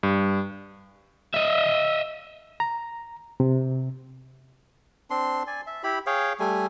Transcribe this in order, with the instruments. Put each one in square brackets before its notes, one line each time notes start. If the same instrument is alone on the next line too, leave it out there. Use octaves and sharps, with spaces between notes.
[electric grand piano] G2
[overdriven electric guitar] D#5 E5
[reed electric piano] A#5
C3
[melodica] C4 D4 C6
D5 G#5
E5
E4 G4 B5
G#4 C#5 F5 G5
G3 A3 G#5